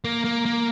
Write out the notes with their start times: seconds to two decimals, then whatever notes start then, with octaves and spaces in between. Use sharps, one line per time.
0.04 A#3
0.25 A#3
0.45 A#3